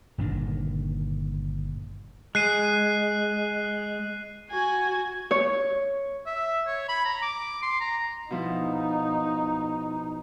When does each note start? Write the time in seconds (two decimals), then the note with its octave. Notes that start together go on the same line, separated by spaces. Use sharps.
0.18 G1 A#2 D#3 D4
2.35 G#3 F#6 C7 D#7
4.50 F#4 G#5
5.31 C#5
6.26 E5
6.67 C#5
6.88 B5
7.05 A#5
7.22 D6
7.62 C6
7.80 A#5
8.30 B2 F3 D#4 E4